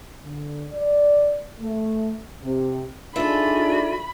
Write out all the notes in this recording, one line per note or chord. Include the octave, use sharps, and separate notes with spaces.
D3
D5
A3
C3
D4 D#4 F4 G#4 A4 E5 B5